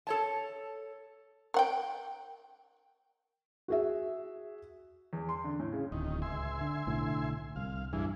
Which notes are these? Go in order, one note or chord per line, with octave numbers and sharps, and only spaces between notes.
A4 C#5 A5
A#4 F#5 G5
F#4 G#4 E5
E2
C6
D3
A2
C#3
D1 D#3
C#2 E5 G#5 C6
D3
B1 A2 D3
C2 F5
E2 G2 E3 G#4